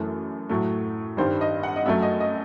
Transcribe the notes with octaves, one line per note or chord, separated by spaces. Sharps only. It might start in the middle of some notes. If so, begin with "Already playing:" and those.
Already playing: F#2 E3 A3
A2 F#3 A3
G2 D#3 G3 C5
D#5
F#5
D#5
F#2 F#3 A3 E5
D#5
D#5